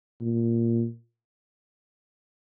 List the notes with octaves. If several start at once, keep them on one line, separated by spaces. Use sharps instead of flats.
A#2